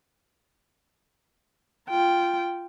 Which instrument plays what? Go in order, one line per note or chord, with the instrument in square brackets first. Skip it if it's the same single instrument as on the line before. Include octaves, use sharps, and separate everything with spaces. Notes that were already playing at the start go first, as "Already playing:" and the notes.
[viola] F4 G5